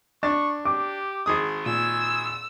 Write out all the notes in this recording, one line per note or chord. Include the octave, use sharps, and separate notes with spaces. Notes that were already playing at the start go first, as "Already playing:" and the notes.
D4 C#6 A6
G4 D6
G#1 G#4 D#6
A#2 G#5 E6